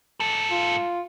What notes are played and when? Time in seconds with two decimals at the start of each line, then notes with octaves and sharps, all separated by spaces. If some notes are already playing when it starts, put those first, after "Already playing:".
0.20 G#2 A4
0.51 F4